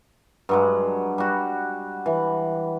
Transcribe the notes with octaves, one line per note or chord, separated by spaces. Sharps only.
G2 F#3 G#3
G3 F#4
E3